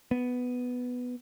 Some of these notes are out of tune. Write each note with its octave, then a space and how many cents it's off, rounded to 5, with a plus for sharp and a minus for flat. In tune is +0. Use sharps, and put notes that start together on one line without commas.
B3 +5